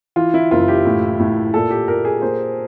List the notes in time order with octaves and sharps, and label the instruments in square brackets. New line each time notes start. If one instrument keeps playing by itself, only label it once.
[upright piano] E3 [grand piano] F4
[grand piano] E4
[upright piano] F#1 [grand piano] F4
[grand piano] G4
[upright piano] A2
A2
[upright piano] A#2 [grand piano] A4
[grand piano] G4
[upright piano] A#2 [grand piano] A#4
[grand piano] G#4
[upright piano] A#3 [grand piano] C5